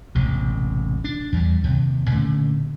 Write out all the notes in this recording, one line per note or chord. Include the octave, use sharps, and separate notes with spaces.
E1 A1 C3
D4
E2 G3
D#2 C3
A#2 D3 A3 C#4